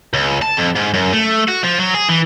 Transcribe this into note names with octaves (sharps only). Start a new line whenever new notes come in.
C#2
A5
F2
G#2
F#2
A3
F#4
F3
F#3
G#4
E3